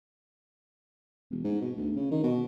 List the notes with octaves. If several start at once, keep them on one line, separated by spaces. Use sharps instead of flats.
E1
G#2
B2
D2
C#3
D#3
B2